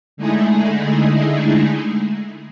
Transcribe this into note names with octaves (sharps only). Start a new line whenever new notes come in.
D3 G#3 A3 D#4 E4 G#4